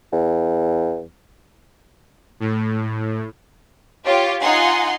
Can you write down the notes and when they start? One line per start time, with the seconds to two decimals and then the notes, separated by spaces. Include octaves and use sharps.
0.13 E2
2.40 A2
4.06 F4 G4 C#5
4.41 D#4 F4 F#5 G#5 C6